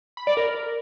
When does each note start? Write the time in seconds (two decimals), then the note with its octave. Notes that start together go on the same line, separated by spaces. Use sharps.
0.17 B5
0.27 D5
0.37 A#4